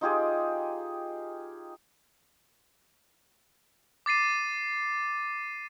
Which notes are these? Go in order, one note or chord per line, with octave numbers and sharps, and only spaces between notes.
D#4 F4 G4 G#4
D6 A6 C7 D#7